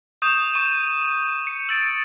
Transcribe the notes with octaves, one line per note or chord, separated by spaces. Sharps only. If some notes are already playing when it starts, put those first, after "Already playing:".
C#6 D#6 G6 E7
C#6 D#7
C#7
E6 A6 D7